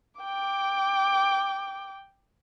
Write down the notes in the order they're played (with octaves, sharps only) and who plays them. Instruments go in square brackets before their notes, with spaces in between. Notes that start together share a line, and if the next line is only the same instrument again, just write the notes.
[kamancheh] G5 D6